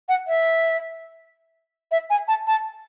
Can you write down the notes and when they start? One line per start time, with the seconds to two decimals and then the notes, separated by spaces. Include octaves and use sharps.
0.09 F#5
0.27 E5
1.92 E5
2.10 G#5
2.28 A5
2.47 A5